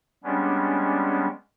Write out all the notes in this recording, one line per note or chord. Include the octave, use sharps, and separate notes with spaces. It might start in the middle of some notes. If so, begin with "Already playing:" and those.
G3 G#3 B3 C#4 D4